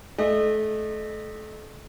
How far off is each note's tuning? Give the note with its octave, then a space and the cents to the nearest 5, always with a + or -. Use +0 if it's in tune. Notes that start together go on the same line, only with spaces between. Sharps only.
A3 -30 D#5 -40